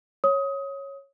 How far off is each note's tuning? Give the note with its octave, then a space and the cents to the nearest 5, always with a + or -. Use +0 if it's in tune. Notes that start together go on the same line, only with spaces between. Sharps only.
C#5 -5 D#6 +20